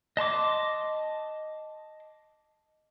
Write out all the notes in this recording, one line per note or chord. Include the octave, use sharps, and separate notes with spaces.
D#5 A5 C6 D6